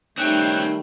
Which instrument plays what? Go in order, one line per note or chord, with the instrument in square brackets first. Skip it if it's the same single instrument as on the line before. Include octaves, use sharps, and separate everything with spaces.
[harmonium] D#3 G3 A3 [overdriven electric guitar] C4 C#4 [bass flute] D#4 [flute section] G5 F#6